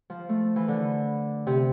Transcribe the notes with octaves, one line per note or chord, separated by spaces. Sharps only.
F3
A3
E3
D3
C3